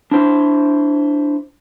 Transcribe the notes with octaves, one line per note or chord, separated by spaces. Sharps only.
D4 E4 C5